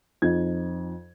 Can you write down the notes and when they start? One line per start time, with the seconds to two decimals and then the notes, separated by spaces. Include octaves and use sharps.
0.22 F2 D#4 G#6